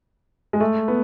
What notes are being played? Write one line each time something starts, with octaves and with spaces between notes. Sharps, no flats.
G#3
A3
B3